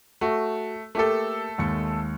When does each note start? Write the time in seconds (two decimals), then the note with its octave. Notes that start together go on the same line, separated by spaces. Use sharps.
0.21 A3 F#4
0.95 A3 A#3 G4 A4
1.58 D#2 G#3 C#7